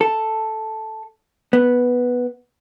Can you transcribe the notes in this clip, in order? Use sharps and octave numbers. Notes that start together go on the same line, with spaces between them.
A4
B3